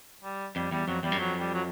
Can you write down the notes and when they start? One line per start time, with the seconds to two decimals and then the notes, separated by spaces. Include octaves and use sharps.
0.24 G3
0.56 F2 G3
0.71 E2 G3
0.88 F2 F#3
1.03 E2 G3
1.12 F#2
1.19 F2 F#3
1.40 G3
1.54 F#3